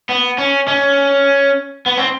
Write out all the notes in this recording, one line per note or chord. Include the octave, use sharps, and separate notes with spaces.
B3
C#4
C#4
B3
C4